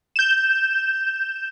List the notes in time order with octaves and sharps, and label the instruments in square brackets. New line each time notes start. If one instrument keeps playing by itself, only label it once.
[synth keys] G6 E7